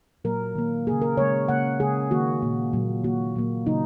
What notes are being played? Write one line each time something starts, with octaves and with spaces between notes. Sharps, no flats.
A#2 F#3 A#3 A#4
D#3 A#3
C#3 A#3 G#4
A#4
C#3 G#3 C#5
C#3 A#3 F#5
C#3 G#3 G#4
D#3 A#3 F#4
A#2 A#3
A#2 F#3 A#3
D#3 A#3 F#4
A#2 F#3 A#3
C#3 F#3 A#3 D#4